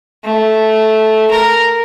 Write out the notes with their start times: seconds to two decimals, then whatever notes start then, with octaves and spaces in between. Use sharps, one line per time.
0.24 A3
1.30 A#4